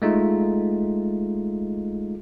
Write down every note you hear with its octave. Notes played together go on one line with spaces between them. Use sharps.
G#3 A3 D#4 F4